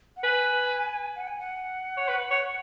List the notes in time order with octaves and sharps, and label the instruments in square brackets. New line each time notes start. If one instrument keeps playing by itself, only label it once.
[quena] F#5
[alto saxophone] B4 [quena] G#5
[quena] F#5
G#5
F#5
[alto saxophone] C#5
B4
C#5